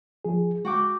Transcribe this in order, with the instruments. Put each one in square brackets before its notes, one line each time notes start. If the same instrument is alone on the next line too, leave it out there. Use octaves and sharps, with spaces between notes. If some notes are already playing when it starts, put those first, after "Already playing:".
[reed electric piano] F3 G#4
[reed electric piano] G#3 [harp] F#4 G5 D6